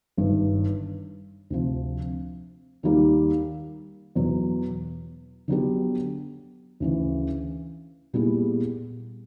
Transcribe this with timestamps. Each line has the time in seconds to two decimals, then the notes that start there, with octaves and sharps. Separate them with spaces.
0.17 G1 G2 D#3
1.50 D2 C3 F3
2.83 D#2 D#3 G3 A#3
4.15 E2 B2 F#3
5.48 D3 F#3 B3 D4 G4
6.80 D2 C#3 E3
8.13 A#2 G3 B3 E4 G#4